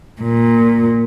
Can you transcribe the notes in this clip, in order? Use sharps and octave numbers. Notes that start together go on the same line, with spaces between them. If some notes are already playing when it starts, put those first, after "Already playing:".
A#2